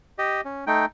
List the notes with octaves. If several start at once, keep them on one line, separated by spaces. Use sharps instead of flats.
G4 D#5
C#4
A3 D#4 G5